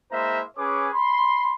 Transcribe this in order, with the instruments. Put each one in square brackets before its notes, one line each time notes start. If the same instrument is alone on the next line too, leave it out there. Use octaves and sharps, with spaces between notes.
[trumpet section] G#3 A#3 E4 C5 E5 A#5
C#4 G#4 B4 C#5 G#5 D6
B5 C6